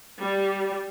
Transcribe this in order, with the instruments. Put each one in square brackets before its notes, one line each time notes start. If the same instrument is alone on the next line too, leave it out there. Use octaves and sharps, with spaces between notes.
[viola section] G3